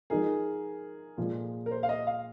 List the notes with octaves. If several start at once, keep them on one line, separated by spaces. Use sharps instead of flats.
F3 G#3 D#4 G#4 A#4
A#2 F3 G#3
A#4
C5
F5
D#5
F5